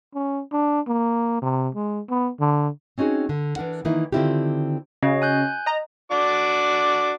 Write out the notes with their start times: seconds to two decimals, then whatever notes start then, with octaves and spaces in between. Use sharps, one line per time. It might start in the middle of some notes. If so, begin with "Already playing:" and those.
0.14 C#4
0.52 D4
0.87 A#3
1.42 C3
1.75 G#3
2.10 B3
2.40 D3
2.98 C4 C#4 D#4 F#4 G#4
3.29 D3
3.56 E3 D4 A#4 F#5
3.85 D#3 E3 A#3 D#4 E4
4.12 D3 D#3 C4 E4 F4 G4
5.03 C#3 C#4 F#4 D#5
5.22 G#5 F#6 G6
5.66 D#5 A#5
6.11 D4 F#4 D6